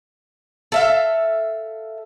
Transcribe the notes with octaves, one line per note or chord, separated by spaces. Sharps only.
A4 E5 F5